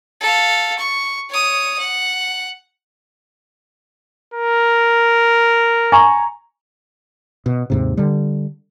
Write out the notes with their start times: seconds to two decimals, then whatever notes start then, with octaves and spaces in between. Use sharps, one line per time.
0.21 A4 F5
0.78 C#6
1.29 C#5 D#6
1.79 F#5
4.34 A#4
5.92 G#5 A#5 C#6
7.46 B2
7.70 D#2 G#2 C3
7.97 D3 G3